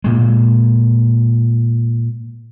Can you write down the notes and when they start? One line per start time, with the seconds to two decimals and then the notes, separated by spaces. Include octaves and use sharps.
0.04 A#2 G#3